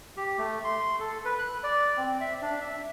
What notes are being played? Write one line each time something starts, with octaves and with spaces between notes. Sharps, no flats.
G4
A3
C6
A4
B4
F#6
D5
C4
E5
D4
E5